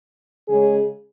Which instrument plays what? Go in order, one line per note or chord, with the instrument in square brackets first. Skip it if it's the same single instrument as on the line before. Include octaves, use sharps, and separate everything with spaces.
[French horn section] C#3 G#3 C#4 G#4